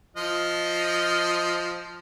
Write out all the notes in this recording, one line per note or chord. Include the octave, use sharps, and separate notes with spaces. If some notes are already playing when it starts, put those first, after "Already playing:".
F3 D#5 F6